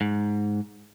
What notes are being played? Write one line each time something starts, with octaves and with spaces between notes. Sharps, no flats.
G#2